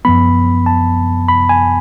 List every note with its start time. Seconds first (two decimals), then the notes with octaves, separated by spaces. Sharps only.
0.05 F#2 F3 B3 B5
0.66 A5
1.28 B5
1.49 G#5